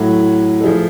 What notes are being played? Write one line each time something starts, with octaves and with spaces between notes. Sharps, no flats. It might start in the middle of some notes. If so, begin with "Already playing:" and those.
Already playing: A2 F#3 A3 F#4
A4
F3 A3 G#4